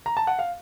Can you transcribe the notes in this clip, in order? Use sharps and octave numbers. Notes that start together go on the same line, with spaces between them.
A#5
A5
F#5
F5